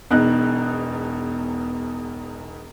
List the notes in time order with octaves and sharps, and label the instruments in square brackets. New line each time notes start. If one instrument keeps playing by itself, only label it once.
[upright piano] E1 E2 D#4 D#5 F#6